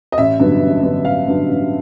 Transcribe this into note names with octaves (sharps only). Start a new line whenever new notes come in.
D#5
A1 E5
G2 D3 F#3 B3
A1
G2 D3 F#3 B3
A1 F5
G2 D3 F#3 B3
A1